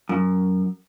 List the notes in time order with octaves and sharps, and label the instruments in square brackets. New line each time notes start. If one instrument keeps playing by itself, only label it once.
[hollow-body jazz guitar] F#2